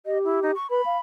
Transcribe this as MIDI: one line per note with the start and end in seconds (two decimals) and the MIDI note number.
0.06 0.54 67
0.06 0.18 75
0.24 0.42 64
0.43 0.51 63
0.55 0.70 85
0.70 0.81 71
0.70 0.99 83
0.85 0.97 77